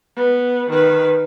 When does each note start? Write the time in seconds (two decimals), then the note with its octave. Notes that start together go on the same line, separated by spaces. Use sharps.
0.16 B3
0.70 D#3 B4